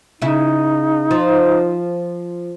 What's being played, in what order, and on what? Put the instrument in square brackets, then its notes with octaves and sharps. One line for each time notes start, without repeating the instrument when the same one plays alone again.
[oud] C#3 E4 [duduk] D#4
[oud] F3